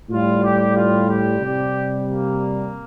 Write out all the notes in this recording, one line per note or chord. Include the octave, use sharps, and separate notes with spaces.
A2 G3 F4
G4
F4
G4
C3 G3
A#3